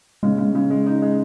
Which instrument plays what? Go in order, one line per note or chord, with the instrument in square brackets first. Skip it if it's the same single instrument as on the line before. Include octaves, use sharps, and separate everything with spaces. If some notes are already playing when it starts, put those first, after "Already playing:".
[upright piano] C#3 [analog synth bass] G#3
[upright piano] C#3
C#3
G#3
D#4
G#3